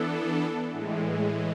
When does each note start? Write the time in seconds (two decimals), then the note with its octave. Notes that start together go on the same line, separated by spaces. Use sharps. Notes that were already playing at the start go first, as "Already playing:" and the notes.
Already playing: E3 B3 D4 A4
0.72 A2 E3 G#3